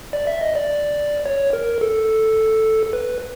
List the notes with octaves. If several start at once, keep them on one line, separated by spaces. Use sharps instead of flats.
D5
E5
D#5
D5
C#5
A#4
A4
B4